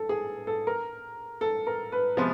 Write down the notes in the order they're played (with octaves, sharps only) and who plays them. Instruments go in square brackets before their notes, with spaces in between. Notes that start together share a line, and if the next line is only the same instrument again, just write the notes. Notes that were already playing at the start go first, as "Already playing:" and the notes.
Already playing: [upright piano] A4
G#4
A4
A#4
A4
A#4
B4
[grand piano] C3 F3 G#3 B3 [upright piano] C5